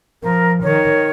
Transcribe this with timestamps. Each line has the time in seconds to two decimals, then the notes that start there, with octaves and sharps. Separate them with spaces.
0.23 F3 A#4
0.63 D#3 C#5